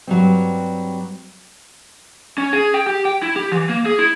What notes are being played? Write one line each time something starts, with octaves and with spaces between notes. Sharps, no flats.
G2 F#3 G3 C4
C#4
G#4
G5
G4
G5
E4
G4
E3
A#3
G#4
E4